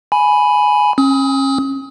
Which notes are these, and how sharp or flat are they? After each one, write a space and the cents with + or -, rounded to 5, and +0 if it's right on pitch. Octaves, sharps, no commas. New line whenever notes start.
G#5 +10 B5 +0
C#4 -35 D#6 +30